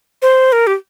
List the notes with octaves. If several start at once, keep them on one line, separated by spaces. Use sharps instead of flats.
C5
A#4
G4